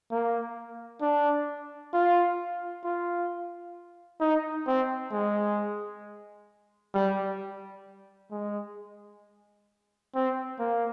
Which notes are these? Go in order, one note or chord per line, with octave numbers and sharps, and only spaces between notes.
A#3
D4
F4
F4
D#4
C4
G#3
G3
G#3
C4
A#3